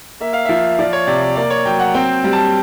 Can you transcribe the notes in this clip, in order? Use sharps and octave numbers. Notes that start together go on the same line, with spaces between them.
A#3 E5
F5
F3 E5
F3 D5
C#5
C3 D5
D5
A#3 D5
C#5
F#3 G5
F#5
C4 G5
G3
A5